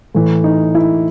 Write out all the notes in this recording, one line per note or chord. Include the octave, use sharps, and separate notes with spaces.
A2 E3
D#4
E4